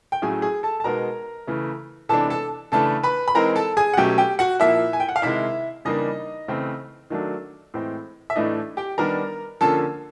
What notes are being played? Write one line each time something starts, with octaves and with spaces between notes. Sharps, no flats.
G5
A2 F#3 A3 C#4 G#4 G#5
G#4 G#5
A4 A5
A5
B2 G#3 B3 D#4 A#4 A#5
C#3 E3 A3
C3 E3 G#3 B3 D4 A4 A5
A4 A5
C#3 E3 A3 D4 A4 A5
B4 B5
B5
E3 G#3 C4 D#4 A#4 A#5
A4 A5
G#4 G#5
F#5
B2 F#3 A3 C#4 G4 G5
G4 G5
F#4 F#5
A#2 F3 A#3 E4 E5
G#5
G5
F#5
F5
C3 D#3 G#3 E4 E5
C#3 E3 G3 A#3 D4 D#4 D#5
C#3 E3 A3 C4
D#3 F#3 A3 D4
A2 E3 G#3 C4
E5
A2 E3 A3 D4 D#4 D#5
G4 G5
D#3 G3 B3 D4 A#4 A#5
D3 F3 A#3 C#4 A4 A5